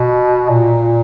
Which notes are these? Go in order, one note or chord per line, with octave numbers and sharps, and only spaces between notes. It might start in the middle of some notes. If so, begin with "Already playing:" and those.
Already playing: B2
A#2